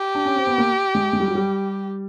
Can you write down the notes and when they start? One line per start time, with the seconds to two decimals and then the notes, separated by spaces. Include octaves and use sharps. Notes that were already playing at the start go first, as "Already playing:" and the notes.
Already playing: G4
0.15 D4
0.25 C#4
0.36 C4
0.47 B3
0.58 A#3
0.95 G#3
1.13 G#3
1.20 G3
1.28 F#3
1.35 G3